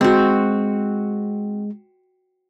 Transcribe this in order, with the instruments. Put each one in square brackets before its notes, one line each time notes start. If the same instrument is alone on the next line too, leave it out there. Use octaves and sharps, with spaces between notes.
[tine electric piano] G#3 [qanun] C4 F#4